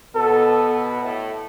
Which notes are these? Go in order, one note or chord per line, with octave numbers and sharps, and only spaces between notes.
B2 B3 A4
A2 A3